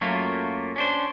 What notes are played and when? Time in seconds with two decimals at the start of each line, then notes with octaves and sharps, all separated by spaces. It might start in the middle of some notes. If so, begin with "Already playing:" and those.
0.01 F#2 F#3 A3 A#3 F4
0.76 C#4 D4 C5